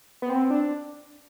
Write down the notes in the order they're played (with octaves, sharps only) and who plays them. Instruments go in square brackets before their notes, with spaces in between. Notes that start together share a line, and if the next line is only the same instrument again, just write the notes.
[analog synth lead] B3
C4
D4